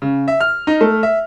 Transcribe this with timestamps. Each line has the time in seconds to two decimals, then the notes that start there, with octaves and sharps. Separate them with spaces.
0.02 C#3
0.28 E5
0.40 F6
0.67 D#4
0.81 A3
1.03 E5